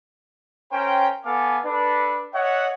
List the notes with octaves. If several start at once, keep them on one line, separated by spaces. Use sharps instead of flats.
C#4 A#4 C5 G5
B3 A4 F5 G#5 D6
D4 A4 B4
C#5 D#5 E5 F#5